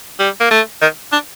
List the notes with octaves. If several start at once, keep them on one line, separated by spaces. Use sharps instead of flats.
G3
A#3
A3
D#3
D4